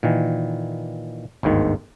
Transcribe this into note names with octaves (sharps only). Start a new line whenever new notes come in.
A#2 D#3 E3
G1 D2 G#2 D#3